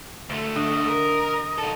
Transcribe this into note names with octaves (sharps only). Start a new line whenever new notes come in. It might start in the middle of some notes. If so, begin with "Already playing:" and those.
D2 A3
D3 D#5
A#4
D#4 A4